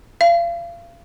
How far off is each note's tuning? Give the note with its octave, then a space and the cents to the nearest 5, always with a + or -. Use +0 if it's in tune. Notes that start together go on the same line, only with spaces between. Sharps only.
F5 -35